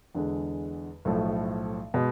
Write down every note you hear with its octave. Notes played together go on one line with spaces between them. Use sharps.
E2 D3 G#3
B1 A2 F3 A3
B2 G#3